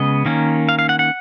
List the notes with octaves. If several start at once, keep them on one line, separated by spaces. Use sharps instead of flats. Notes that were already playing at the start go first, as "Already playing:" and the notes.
Already playing: C#3 G#3 B3 D#5
D#3 A#3 C#4
F5
F5
F#5
F#5